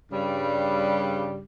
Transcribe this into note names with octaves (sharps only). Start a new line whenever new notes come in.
G2 C#3 G3